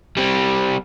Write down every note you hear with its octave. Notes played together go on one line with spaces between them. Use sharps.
G3 C4